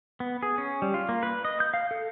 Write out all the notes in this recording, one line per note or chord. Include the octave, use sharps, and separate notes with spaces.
B3
G#4
C#4
G3
F4
A#3
B4
D#5
G6
F5
A4